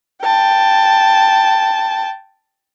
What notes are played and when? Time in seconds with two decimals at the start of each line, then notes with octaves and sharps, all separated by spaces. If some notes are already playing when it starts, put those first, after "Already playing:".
0.22 G5 A5